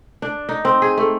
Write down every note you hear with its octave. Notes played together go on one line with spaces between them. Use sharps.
D4
D#4
C4
G#4
A3